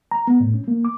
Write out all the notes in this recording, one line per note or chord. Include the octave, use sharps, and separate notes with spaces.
A#5
B3
A2
C#4
A#3
D6